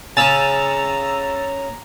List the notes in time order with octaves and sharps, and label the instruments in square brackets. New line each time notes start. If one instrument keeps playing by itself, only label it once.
[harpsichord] C#3 C#4 [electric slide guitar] G#5 [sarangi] A#5 [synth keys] E6 A6